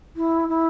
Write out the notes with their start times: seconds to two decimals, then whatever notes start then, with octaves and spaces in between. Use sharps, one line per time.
0.16 E4
0.49 E4